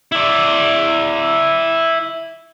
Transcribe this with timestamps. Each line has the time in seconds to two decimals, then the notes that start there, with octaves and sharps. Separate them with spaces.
0.12 E4 D5